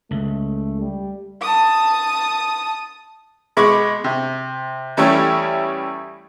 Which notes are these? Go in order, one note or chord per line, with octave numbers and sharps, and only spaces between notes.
C#2 A3
G3
A5 D#6
B2 G#3 B5 C#6 D6
C3
E2 G3 A3 C#4 E4